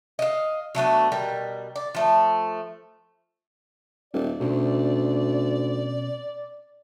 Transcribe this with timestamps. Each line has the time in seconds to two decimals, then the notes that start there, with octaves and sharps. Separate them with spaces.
0.19 D#5 F5
0.75 F#3 A3 B3 D4
1.12 B2 G3 A#4
1.76 D5
1.95 F3 A3
4.14 D#1 D5
4.40 D2 B2 C4 C#4